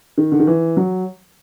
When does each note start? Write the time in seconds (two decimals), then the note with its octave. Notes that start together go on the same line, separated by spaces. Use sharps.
0.18 D#3
0.32 D3
0.40 D#3
0.47 E3
0.77 F#3